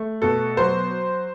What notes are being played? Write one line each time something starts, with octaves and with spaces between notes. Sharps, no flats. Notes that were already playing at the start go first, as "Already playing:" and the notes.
Already playing: A3
B2 A4
F#3 C5